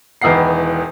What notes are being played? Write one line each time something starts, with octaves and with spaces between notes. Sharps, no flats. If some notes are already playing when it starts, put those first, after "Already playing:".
E1 D#3 E3 B3 F#5 C7